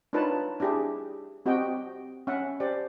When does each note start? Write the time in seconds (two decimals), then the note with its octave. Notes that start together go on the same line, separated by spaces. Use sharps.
0.13 D4 D#4 F4 B4 C#5 A5
0.60 D4 E4 G4 G#4
1.46 C4 F#4 G4 D#5 G5
2.27 C#4 E5 F#5
2.60 G4 C5 D5